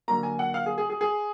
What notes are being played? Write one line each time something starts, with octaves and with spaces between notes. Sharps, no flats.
D3 F#3 A#3 A#5
G#5
F#5
F5
G#4
G#4
G#4
G#4